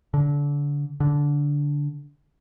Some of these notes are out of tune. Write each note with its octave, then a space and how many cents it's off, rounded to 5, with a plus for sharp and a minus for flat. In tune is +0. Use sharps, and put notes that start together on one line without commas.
D3 -25
D3 -15